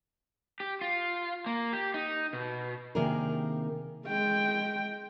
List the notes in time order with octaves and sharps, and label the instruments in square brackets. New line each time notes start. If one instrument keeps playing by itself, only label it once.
[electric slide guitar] G4
F4
A#3
G4
D#4
B2
[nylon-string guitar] C3 D#3 A#3 D4 G#4 A#4
[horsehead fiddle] G#3 G5